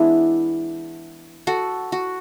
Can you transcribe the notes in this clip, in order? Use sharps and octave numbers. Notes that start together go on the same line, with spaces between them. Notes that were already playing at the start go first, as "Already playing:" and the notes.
Already playing: E3 G#3 B3 D4 E4 G#4
F#4 A4
F#4